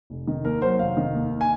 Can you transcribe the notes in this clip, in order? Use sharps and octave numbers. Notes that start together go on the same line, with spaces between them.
F1
D#3
D#2 A#4
F#3 C5
F1 F5
D#3
D#2
G#5